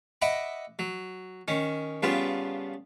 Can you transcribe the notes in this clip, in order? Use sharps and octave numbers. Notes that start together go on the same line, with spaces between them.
D#5 E5 F#5 B5 D6
F#3
D#3 C#4
G2 C#3 B3 F4